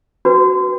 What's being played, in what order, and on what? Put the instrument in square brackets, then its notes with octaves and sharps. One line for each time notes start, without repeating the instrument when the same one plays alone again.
[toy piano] D4 F#4 B4